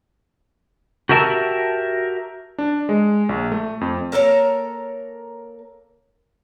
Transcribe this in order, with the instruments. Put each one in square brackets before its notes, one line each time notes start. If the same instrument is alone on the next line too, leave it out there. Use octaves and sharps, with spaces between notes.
[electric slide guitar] F#4 G4 A#4 E5 A5
[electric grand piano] D4
G#3
A#1
A3
F2
[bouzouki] A#3 A4 A#4 C#5